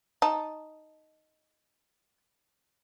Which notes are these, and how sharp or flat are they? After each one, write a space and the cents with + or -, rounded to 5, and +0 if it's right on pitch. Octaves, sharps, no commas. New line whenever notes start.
D#4 +0 A5 +0